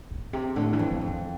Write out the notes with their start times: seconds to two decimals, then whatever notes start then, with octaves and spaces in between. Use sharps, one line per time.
0.11 A2
0.33 C3
0.56 A2 D3
0.73 E3
0.79 F2
0.91 E3
1.01 F2
1.07 E3